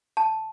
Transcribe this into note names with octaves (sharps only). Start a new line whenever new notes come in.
A5